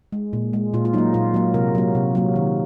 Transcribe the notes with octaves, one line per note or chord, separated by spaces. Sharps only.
G#3
A#2
G#3
A#2 F4
F4
F#3 A#3 D#4
A#2 F4
F#3 A#3
C3 A#4
F#3 A#3
C3
F#3 A#3
D#3